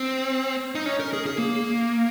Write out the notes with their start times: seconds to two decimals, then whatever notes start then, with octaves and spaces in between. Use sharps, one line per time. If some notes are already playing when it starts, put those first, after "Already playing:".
Already playing: C4
0.75 D#4
0.86 C#4
1.00 A#4
1.13 G#4
1.26 G#4
1.38 A#3